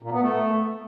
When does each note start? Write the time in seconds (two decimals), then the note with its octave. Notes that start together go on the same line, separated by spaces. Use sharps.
0.03 A#2
0.12 B3
0.22 A3